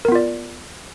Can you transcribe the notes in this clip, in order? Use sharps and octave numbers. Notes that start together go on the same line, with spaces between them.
B3 F4 A#4 D5